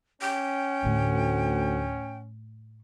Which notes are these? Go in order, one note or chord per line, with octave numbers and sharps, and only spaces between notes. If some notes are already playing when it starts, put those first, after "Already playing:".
C#4 G5
D2 A2 A3